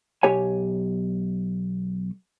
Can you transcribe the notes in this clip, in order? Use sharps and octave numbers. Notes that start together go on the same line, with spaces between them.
B1 G4 C#5 G#5